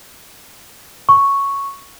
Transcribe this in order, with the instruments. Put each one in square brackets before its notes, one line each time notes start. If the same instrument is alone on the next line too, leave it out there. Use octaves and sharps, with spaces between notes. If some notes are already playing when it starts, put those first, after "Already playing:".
[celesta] C#6